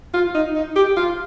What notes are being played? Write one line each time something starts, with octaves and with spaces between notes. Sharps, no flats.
F4
D#4
D#4
G4
F4